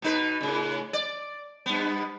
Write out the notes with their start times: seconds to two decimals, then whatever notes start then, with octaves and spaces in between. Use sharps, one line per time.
0.02 B2 D#4 B4
0.41 A2 C#3
0.93 D5
1.66 G2 B3